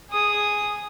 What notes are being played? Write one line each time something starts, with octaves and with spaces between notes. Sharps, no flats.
G#4 D#6